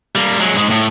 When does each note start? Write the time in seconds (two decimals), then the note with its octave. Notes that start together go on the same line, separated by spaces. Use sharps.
0.15 G3 A#3
0.39 F#3 G#3
0.55 G#2 G#3
0.70 A2